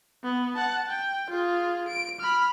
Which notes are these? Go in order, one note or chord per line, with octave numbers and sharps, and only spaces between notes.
B3
F#5 A5
G5
F4 G#4
D7
B5 F6